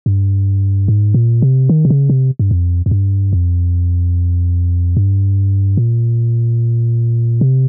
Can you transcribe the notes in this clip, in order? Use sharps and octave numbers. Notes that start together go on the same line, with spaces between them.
G2
G#2
A#2
C3
D#3
C3
C#3
C3
G2
F2
F2
G2
F2
G2
A#2
C3